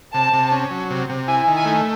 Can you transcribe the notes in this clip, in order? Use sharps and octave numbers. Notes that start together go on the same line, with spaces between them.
C3 A5
C3
C#4
F#3
C3
C3
E4 G#5
D#3
G#5
A3